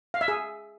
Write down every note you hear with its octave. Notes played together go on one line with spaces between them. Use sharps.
F5
E5
G#4